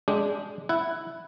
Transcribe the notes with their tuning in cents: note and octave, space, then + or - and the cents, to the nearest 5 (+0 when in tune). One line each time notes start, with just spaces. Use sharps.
G#3 +0 D4 -15 G4 +0
E4 +0 F#5 +10